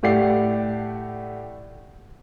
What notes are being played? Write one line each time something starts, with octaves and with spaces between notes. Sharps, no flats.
A2 A3 G4 D5 F#5 C7